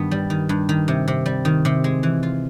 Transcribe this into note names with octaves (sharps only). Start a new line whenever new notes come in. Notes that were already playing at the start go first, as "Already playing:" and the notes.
Already playing: G2 D#3 B3
G3
D#3
G2
D#3
C3
C3
G3
D#3
C3
G#3
E3
F4